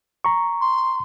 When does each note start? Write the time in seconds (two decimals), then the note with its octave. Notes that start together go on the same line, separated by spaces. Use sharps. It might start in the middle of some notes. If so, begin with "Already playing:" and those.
0.24 A#5 C#6
0.60 C6